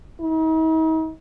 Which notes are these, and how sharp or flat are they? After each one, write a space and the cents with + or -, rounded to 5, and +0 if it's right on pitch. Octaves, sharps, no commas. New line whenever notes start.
D#4 +45